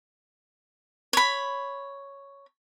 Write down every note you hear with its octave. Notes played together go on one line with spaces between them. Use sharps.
C#5 B5